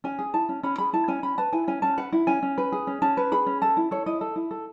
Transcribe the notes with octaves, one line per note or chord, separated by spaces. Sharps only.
C#4 G#5
G#4
E4 A5
C#4
C#4 B5
G#4 B5
E4 A5
C#4 G#5
C#4 B5
B4 A5
E4 G#5
C#4 G#5
C#4 A5
B4 F#5
E4
C#4 G#5
C#4
B4
G#4
C#4
C#4 A5
B4
G#4 B5
C#4
A4 A5
E4
A4 C#5
E4 D#5
A4
E4
A4